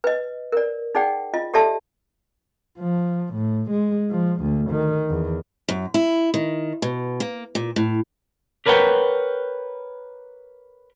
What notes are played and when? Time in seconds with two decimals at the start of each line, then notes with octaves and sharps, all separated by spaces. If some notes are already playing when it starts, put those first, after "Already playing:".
0.04 B4 D#5
0.52 A#4 D5
0.95 D#4 G#4 D5 F#5 G5
1.34 F4 D#5
1.54 G4 A4 D5 E5 A5
2.79 F3
3.34 A2
3.70 G#3
4.10 F3
4.41 D2
4.70 D#3
5.09 E2
5.68 F#2
5.94 E4
6.34 D#3
6.82 B2
7.20 A#3
7.55 A#2
7.76 A2
8.66 G4 A#4 B4 C#5 F#5 G5